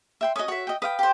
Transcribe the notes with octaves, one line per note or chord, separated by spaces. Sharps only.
E5 G5 C6
C#4 F#4 D#5 D#6
F#4 C#5 E5
D#5 G5
B4 F5 G5 D#6
G4 C5